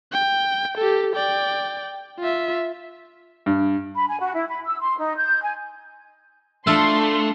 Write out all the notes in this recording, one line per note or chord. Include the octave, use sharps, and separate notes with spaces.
G5
G4 A4
D5 G5
F4 E5
G2
B5
G#5
F#4
E4
B5
E6
C6
D#4
G6
G#5
A3 D4 E4 F4 A4 C6